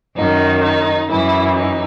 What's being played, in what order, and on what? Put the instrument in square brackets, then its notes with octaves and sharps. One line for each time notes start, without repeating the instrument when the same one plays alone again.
[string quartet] F#2 D#3 D#4
D#4
F#2 E3 E4
D#4